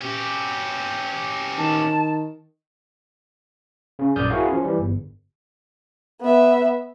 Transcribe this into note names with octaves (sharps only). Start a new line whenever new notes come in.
C#4 G4
D#3 A5
C#3 C#4
A#1 F#2 D5 D#6 F6 G6
E4 F#4 G#4 A#4 C#5 F5
F3 C#4
E3 G3
G1
B3 E5